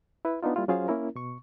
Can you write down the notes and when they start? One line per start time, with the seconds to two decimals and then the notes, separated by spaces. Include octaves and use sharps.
0.25 E4 B4
0.43 B3 D4 D#4 F4
0.56 G3 A#3 E4 F4
0.68 F#3 C#4 F4 G#4 C5 F5
0.88 A#3 C#4 E4 A#4
1.16 B2 C#6